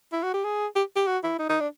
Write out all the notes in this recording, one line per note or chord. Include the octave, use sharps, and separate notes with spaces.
E4
F#4
G4
G#4
G4
G4
F#4
E4
D#4
D#4
D4